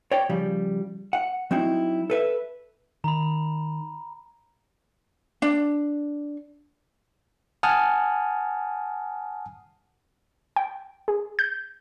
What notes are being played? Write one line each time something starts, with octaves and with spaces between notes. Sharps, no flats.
C#5 D5 G5
C#3 F3 G3
F#5
F#3 C4 D#4 E4
A4 B4 E5
D#3 A#5 B5
D4
F#5 G#5 A5 D#6 F6
G5
G#4
G6